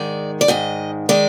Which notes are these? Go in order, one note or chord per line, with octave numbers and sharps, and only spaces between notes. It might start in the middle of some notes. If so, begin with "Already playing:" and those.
Already playing: G#2 D#3 G#3 D5
D5
G#2 D#3 G#3 D#5
D#3 G#3 D5